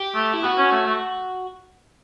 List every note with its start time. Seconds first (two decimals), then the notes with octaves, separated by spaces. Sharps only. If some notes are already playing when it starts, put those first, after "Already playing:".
Already playing: G4
0.15 A3
0.33 E4
0.43 B3 F#4
0.58 C#4
0.72 A3
0.86 A3